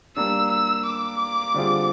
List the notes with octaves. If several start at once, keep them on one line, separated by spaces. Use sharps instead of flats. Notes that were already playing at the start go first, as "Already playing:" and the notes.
G3 A#3 D4 E6
E6
D6
D3 G3 C4 F4 G#4